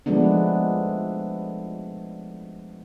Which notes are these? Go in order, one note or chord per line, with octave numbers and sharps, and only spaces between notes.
F3 G#3 A3 B3 D4